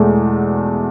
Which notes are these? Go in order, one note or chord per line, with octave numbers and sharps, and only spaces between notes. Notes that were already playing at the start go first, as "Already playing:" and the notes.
Already playing: E2 B2 G#3 A3